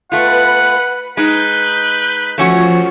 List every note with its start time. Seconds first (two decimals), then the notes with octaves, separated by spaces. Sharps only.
0.12 A3 F4 B4 F#5 B5
1.17 G#3 D#4 B4 G6
2.38 F3 A3 C#4 F#4